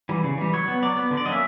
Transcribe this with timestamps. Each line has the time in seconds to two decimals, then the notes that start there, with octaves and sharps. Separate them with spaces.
0.09 E3 G3
0.24 C#3
0.38 E3 G3
0.53 F#3 C#5
0.68 B3
0.82 F#3 D5
0.96 B3
1.11 D3
1.17 D5
1.25 F#3 D#5
1.28 A#3 C#4 E5